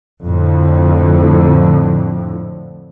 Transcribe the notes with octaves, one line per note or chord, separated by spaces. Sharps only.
F2 A2 D3